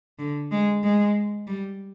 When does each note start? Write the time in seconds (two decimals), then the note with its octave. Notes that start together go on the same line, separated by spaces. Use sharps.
0.19 D3
0.52 G#3
0.84 G#3
1.48 G3